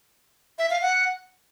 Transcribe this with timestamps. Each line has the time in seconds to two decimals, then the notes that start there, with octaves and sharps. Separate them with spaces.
0.58 E5
0.70 F5
0.82 F#5